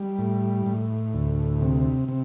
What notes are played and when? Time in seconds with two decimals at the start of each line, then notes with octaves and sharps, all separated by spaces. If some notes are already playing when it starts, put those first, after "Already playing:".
Already playing: G3
0.19 A2
0.66 A2
1.14 D2
1.61 C3
2.08 C3